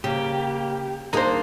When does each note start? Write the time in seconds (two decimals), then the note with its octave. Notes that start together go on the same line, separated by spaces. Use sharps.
0.04 C#3 A#3 G4
1.13 D#2 A#3 D4 D#4 G#4 C5